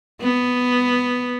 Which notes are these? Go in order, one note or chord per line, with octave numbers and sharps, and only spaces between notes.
B3